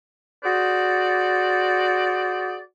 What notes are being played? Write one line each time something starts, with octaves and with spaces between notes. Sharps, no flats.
F#4 G#4 C5 D5